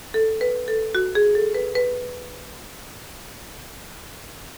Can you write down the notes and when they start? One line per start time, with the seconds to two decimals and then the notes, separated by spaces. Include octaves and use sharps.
0.14 A4
0.41 B4
0.68 A4
0.95 F#4
1.15 G#4
1.35 A4
1.55 B4
1.75 B4